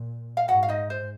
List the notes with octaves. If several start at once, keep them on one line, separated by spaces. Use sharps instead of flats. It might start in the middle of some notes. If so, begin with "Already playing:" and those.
Already playing: A#2
F5
G#2 F#4 F#5
F5
D#4 D#5
C5